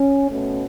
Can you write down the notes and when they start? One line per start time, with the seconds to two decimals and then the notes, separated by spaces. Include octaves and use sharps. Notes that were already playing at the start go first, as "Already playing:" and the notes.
Already playing: C#4
0.30 B2 A3 C#4